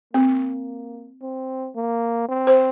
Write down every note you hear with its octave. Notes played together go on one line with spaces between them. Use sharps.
A#3 C4
C4
A#3
C4
C5